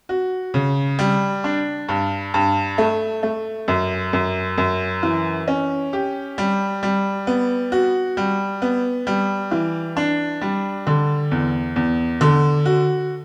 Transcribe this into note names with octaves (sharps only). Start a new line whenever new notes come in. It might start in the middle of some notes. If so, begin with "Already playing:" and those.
F#4
C#3
G3
D4
G2
G2
A3
A3
F#2
F#2
F#2
E3
C#4
G4
G3
G3
B3
F#4
G3
B3
G3
E3
D4
G3
D3
E2
E2
D3
F#4